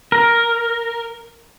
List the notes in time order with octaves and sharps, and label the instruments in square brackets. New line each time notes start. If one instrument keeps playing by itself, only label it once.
[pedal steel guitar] A#4